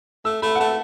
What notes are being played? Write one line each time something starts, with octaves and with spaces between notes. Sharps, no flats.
A3 E6
A3 B5
F#5
A3 A5